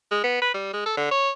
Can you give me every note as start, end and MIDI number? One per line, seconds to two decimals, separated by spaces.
0.11 0.22 56
0.24 0.41 59
0.42 0.50 71
0.54 0.69 55
0.73 0.83 56
0.86 0.93 69
0.97 1.09 50
1.11 1.30 73